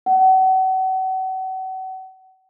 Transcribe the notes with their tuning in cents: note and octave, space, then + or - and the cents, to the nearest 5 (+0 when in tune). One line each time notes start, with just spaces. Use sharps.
F#5 +35